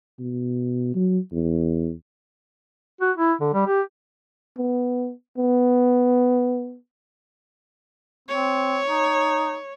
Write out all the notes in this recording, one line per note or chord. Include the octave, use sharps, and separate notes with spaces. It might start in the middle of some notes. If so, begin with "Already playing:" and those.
B2
F#3
E2
F#4
E4
D3
G3
G4
B3
B3
C4 C#5
D#4